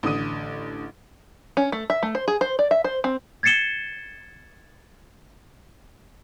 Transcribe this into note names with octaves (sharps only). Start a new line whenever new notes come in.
A1 D3 D#6 D#7
C#4
A3
E5
A3
C5
G#4
C5
D5
E5
C5
C4
G#6 A6 C7 C#7 E7 G7